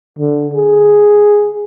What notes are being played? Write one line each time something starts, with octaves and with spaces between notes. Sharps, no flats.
D3
G#4